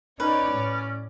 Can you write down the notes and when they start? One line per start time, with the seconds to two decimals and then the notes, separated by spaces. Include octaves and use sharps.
0.20 C#4 D#4 B4 C#5 D5
0.51 A2